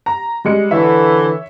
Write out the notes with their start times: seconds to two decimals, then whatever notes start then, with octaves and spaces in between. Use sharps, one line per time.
0.06 A#5
0.45 G3 G#3 C#7
0.71 D3 E3 C#5 E5